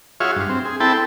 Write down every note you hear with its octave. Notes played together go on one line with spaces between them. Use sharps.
F4 F#4 G#4 C#5 E5 F5
G2
C4
G#4
C4 E4 A4 G5 A5 B5
A4